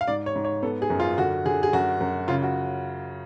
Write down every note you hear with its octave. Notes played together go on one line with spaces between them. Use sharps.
F5
G#2 D5
C#5
G#2
C#5
B3 A4
G#4
F#2
F4
D3 F#4
D3 G#4
G#4
F#2 F#4
F#2
C#3 F4
F#4